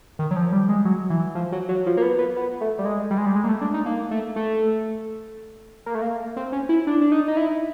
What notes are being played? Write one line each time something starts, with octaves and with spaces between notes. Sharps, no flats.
D#3
F#3
F3
G3
G#3
F#3
E3
F3
F#3
F#3
F3
A#3
B3
B3
B3
A3
G3
G#3
G3
G#3
G3
G#3
A#3
A3
D4
D#4
A#3
A3
A3
A#3
A3
A#3
C4
C#4
E4
D4
D4
D#4
D#4
E4